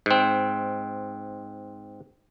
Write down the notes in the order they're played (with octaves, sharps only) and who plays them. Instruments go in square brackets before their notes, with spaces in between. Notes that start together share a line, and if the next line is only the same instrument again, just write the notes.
[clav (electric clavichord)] G#2 C4